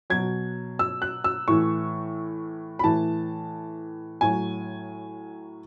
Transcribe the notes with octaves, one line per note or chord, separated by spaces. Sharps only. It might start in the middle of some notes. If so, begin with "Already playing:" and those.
B2 F#3 G#6
E6
F#6
E6
A2 E3 C#6
B5
A2 E3 A5
A2 F#3 G#5